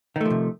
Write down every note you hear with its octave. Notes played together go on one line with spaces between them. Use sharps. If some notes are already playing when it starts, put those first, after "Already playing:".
C3 D#3 F3 A3